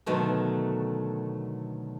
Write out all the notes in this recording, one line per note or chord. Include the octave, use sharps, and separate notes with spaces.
B2 D3 D#3 F#3 A3 A#3